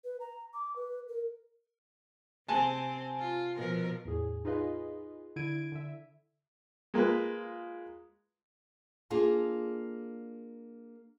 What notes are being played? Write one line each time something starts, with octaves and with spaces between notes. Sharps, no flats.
B4
A#5
D6
B4
A#4
C3 C4 G#5 A5
F4
B2 F3 A#4
E2 A2 G#4
D#4 F4 G#4 B4 D#5 F5
D3 E4 G#6 D7 D#7
D3 E5
G#3 A#3 F4 B4
A#3 D4 F4 G#4 A4